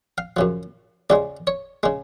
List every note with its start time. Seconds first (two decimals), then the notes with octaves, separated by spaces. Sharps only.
0.18 F5
0.37 F#2 C#3 F3
1.10 C#2 C#3 G#3 D5
1.47 C#5
1.83 C#3 G#3